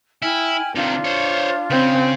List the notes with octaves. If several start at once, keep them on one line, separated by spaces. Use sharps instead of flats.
E4 G5 G#5 F6
C3 D#3 D4 F4 F5
C5 C#5
C#3 C4